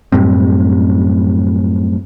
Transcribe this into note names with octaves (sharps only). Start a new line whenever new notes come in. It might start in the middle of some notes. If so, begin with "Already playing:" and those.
F#2 A2 G3 C4